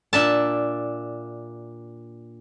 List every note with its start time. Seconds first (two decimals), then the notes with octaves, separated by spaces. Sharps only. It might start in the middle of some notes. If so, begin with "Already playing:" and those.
0.13 A#2 D4 E5 A5